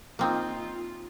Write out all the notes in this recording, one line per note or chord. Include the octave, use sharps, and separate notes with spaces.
A#3 C4 D#4 F4